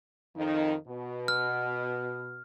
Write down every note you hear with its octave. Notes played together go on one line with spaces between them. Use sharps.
F2 D#3 D#4
B2
F6